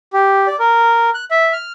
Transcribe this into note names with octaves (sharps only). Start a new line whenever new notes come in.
G4
D5
A#4
F#6
E5
F6